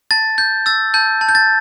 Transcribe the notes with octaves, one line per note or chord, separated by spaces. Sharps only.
A5 A6
G6
E6 A6
A5 G6
A5
G6
A6